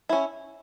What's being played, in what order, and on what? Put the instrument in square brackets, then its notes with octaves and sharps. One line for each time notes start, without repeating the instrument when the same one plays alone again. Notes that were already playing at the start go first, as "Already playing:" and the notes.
[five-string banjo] C#4 E4